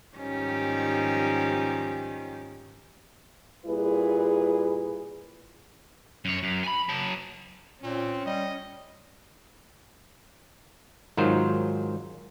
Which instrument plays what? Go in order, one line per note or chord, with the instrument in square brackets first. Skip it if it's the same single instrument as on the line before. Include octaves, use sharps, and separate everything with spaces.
[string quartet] G#2 D#3 F3 G3 C#4 G4
[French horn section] A#2 G3 E4 G#4 B4
[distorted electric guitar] F#2 C#5
F#2
G#5 B5
F#3 A5
[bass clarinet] A#2 [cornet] C4 [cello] C#4
[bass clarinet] G3 [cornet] D#5
[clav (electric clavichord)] G#2 D#3 F#3 F4 C5